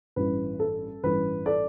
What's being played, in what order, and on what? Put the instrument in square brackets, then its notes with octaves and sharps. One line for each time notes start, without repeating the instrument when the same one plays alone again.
[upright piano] A1 G2 E3 B4
A4
A1 G2 E3 B4
A4 D5